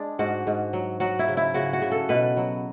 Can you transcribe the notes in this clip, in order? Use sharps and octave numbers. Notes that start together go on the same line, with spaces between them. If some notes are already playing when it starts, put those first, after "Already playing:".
Already playing: G#3 D4
G#2 F#4
G#2
F#3
F#3 F#4
E4
C#3
E4
C#3 F#4
F#4
C#3
A4
B2 B4
F#3